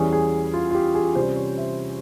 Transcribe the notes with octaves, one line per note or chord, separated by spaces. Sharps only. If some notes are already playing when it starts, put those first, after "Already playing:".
Already playing: E2 E3 G3 C#4 G#4
G#4
F4
F4
G4
G#4
C3 G3 C#4 C5
C#5
E5